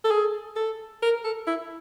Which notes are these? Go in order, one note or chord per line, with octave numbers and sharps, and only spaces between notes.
A4
G#4
A4
A#4
A4
E4